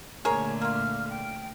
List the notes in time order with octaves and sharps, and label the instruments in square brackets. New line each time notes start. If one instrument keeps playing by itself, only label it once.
[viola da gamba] A#2 D3 A3 [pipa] G#4 A#4 C#5
[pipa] A#3 F4 [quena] F6
[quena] G5